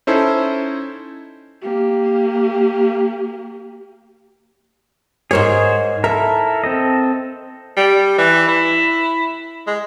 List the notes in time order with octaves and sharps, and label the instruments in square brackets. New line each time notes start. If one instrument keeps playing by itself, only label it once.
[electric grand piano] C#4 D#4 E4 A4 C5
[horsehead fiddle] A#3 G4
[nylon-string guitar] G#2 A#4 C#5 [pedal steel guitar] G#4 C5
[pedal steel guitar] E4 A4 A#4 [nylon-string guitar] E5
[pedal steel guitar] C4 A4 D#5
[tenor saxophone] G3
E3
E4
G#3